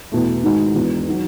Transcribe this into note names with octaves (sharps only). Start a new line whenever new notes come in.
E2 B2 A3
G#2 D#3 G#3 D#4 F#4
E1 E2 B2
D#3 F#3